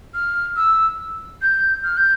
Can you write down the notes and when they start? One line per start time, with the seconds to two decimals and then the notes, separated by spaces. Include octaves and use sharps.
0.14 F6
0.56 E6
1.41 G6
1.84 F6
1.97 G6